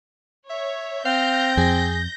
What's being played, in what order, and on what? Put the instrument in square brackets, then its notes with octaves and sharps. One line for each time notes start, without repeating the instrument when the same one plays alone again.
[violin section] C#5 [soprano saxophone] E5
[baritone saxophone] C4 [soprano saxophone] F5 [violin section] G6 A#6
[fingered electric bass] F2 [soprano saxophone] G#4